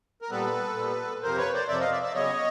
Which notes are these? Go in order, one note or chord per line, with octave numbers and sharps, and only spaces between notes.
A#4
A#2 G3 B3 A4 B4
A#2 G3 B3
F2 C3 F3 A#4 C5
B4 C#5
C5 D5
F2 C3 F3 D5 E5
D#5 F5
D5 E5
D5 E5
C#3 F#3 B3 C#5 D#5